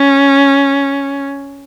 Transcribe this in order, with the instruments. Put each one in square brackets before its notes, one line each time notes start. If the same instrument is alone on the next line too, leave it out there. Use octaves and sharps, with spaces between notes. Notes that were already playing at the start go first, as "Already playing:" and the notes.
Already playing: [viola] C#4